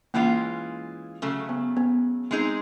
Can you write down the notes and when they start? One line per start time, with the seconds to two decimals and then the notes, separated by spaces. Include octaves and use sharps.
0.14 E3 G#3 A#3 C#4 F4
1.22 C#3 F#3 A3
1.49 B3
1.77 B3
2.31 G#3 C4 D#4 G#4